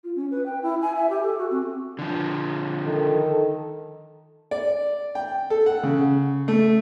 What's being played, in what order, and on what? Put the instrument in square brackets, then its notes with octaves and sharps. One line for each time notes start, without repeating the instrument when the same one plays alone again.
[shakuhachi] F4
C#4
B4
G5
E4
G#5
E5
G4
A4
F#4
C4
[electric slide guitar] D3 F3
[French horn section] D#3 A4
[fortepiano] D5
G5
A4
F#5
C#3
A3